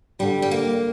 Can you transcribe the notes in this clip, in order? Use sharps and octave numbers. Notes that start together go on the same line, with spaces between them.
G2 D3 G3
G3
A#3